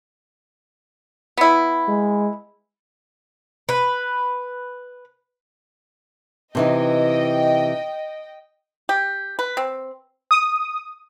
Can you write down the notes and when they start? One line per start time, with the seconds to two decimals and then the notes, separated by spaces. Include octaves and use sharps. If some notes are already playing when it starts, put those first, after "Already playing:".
1.37 B3 E4
1.88 G#3
3.69 B4
6.55 C3 E3 D#4 D#5 G5
8.89 G4
9.39 B4
9.57 C4
10.31 D#6